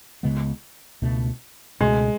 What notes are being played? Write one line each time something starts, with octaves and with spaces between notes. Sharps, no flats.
C#2 C#3 G#3 B3
C#2 B2 A3 D4
C#2 B2 G#3 A3 C#4